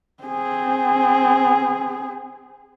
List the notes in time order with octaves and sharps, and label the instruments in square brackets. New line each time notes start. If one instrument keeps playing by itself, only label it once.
[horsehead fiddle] C4 G#4